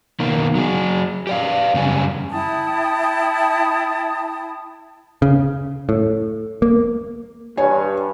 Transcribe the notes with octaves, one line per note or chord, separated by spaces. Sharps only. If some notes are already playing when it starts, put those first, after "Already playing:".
B2 D#3 A#3
F#3 G#4
G4 D5 F5
F#2 C#3 G3 G#5
E4 G5 A5 D#6
C#3
A2
A#3
G2 C#5 G#5